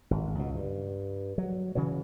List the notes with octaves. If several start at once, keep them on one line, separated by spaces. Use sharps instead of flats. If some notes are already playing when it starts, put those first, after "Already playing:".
G#1
C#2 B2
G2
F#3
C#3 E3 F#3